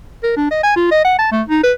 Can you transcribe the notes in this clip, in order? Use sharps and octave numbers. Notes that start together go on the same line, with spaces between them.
A#4
D4
D#5
G#5
F4
D#5
F#5
A5
A3
D#4
B4